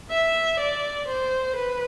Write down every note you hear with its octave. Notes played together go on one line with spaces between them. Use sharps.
E5
D5
C5
B4